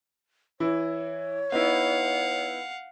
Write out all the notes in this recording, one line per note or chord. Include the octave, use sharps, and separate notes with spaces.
E3 E4 C#5
B3 D#4 E4 F5 F#5